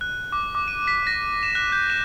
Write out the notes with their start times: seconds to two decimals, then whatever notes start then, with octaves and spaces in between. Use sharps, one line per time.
0.01 F#6
0.32 D6
0.55 D6
0.68 D#7
0.87 B6
1.07 A#6
1.43 E7
1.55 F#6
1.72 G6
1.90 E7